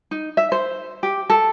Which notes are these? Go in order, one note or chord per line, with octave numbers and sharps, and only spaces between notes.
D#4
E5
C5
G4
A4